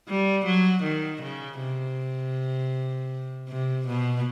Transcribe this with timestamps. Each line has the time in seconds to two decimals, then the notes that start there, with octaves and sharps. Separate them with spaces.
0.08 G3
0.45 F#3
0.83 D#3
1.22 C#3
1.59 C3
3.48 C3
3.87 B2